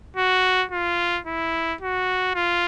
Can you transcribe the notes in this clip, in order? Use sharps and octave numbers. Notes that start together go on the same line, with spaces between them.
F#4
F4
E4
F#4
F4